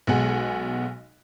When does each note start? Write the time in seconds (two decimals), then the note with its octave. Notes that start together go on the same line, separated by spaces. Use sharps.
0.07 B1 B2 G#3 F#5 G#5